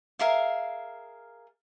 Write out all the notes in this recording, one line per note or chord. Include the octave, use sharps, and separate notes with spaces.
G#4 A#4 E5 F5